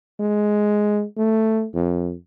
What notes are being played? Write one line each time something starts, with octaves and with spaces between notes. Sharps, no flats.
G#3
A3
F2